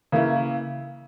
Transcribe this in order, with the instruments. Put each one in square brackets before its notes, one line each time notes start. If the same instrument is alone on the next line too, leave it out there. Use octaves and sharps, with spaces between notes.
[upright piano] C#3 E3 A#3 E4